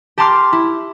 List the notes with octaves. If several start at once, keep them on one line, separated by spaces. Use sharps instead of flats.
G4 A5 A#5 C6 D6 F6
E4